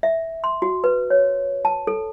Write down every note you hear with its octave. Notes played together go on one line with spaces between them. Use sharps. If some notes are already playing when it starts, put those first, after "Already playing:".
E5
C6
F#4
B4
C#5
A5
A4